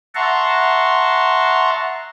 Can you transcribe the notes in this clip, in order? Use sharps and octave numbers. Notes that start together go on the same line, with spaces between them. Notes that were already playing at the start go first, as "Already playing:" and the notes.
E5 F#5 A5 A#5 C6 C#6